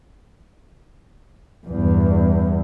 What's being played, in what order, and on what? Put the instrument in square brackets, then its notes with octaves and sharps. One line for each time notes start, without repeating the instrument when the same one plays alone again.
[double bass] E2 G2